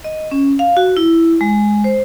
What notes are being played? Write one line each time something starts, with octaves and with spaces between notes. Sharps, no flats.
D#5
C#4
F5
F#4
E4
G#3
C5